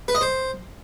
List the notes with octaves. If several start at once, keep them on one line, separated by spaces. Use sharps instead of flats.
B4
D#5
C5